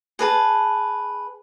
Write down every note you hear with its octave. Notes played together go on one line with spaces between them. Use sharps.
G#4 B4 A5